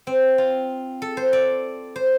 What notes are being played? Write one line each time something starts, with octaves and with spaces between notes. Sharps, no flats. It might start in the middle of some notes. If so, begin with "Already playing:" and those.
C4
F4
A4
C5
D5
C5